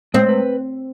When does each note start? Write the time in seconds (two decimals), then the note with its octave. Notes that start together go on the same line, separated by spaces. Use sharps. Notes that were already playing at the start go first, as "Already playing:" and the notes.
0.14 G#3 C4
0.29 B4